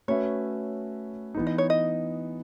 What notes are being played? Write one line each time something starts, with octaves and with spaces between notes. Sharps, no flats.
A3 C#4 F#4 B4 C#5 E5
E3 B3 D#4
D#5
C#5
D#5